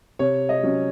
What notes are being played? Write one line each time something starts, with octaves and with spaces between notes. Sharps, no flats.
C3 C#5
D#5
F#3 C#4